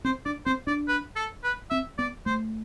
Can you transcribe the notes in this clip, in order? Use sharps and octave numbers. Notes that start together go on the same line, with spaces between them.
C4 C5
D4 D5
C4 C5
D4 D5
B4
A4
B4
C4 E5
B3 D5
A3 C5